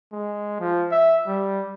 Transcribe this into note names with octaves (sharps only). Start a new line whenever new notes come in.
G#3
F3
E5
G3